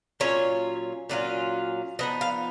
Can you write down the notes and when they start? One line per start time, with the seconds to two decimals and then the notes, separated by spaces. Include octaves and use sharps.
0.20 A#2 F#3 C#4 F4 C#5
1.09 A#2 F#3 C#4 F4
1.99 F3 B3 D#4 D#5
2.21 F5